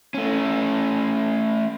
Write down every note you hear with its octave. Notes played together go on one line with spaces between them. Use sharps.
A3 C#4